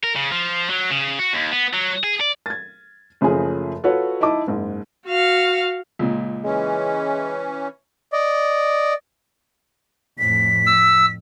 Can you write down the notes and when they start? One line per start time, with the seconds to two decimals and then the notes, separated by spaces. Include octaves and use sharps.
0.03 A#4
0.16 C#3
0.32 F3
0.70 F#3
0.91 C#3
1.19 F#4
1.33 D#2
1.52 B3
1.74 F#3
2.04 G#4
2.21 D5
2.46 G#6 A6
3.21 F#1 C#3 F3 A3 G#4 G#5
3.84 F4 F#4 A4 B4 C#5
4.21 D#4 E4 D#5 A5 D6
4.47 F#1 G#2
5.07 F#4 F5
5.99 C#2 A#2
6.44 E3 G#3 C#4
8.13 D5 D#5
10.19 F2 A2 B6
10.66 E6